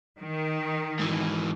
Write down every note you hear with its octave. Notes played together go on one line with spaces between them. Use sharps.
D#3
G#2 E3